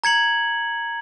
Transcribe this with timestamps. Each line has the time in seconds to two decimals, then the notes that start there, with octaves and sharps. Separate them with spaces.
0.04 A#5 G#6 C#7 F#7